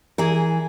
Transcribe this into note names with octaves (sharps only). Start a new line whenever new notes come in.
E3 G#4 A#4